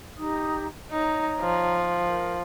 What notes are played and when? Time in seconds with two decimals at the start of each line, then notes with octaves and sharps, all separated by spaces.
0.18 D#4 G4 D#6
0.91 D#4 C#5 A#5
1.40 F3
2.05 A#4